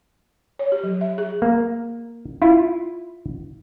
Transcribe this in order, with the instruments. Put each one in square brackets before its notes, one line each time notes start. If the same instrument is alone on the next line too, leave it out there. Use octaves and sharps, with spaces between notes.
[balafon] C#5
G4
F#3
E5
G#4
[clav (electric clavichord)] A#3
E4 F4